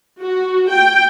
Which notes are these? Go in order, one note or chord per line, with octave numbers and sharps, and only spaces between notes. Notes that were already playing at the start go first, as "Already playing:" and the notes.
F#4
G5